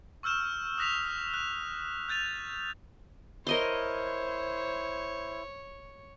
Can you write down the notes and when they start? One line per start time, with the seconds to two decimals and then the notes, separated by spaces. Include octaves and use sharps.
0.23 C#6 E6 F6 G6 E7
0.78 D#6 F#6 A#6 B6 F7
1.34 F#6
2.09 F#6 G6 A6 D#7 F7
3.47 E4 A#4 C5 C#5 D#5 C6